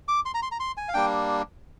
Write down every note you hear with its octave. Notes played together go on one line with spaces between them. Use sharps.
D6
C6
A#5
C6
A#5
C6
G#5
F5
G3 A#3 D4 G5